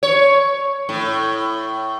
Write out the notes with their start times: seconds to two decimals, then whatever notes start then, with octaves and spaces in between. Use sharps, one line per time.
0.03 C#5
0.89 A2